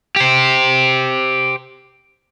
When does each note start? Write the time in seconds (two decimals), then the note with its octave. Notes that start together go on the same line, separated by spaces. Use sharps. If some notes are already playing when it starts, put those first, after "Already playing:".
0.16 G4 C5